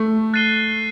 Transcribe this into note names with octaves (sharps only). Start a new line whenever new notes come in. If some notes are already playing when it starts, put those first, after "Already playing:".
Already playing: A3
F#6 A6 C7 D#7 G7